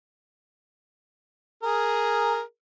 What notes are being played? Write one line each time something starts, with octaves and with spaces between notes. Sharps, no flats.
G#4 A#4